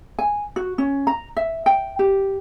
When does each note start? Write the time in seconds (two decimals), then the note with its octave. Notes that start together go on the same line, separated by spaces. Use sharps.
0.19 G#5
0.56 F#4
0.78 C#4
1.07 A#5
1.37 E5
1.66 G5
1.99 G4